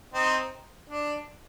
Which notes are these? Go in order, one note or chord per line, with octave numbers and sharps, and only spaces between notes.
C4 D#4
D4